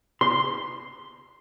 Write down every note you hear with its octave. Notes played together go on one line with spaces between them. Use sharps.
C6